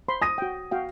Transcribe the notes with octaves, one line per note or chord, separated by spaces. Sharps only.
C5 B5 C6
D#6 A#6 D#7
F#4 G5
F#4 F5 G5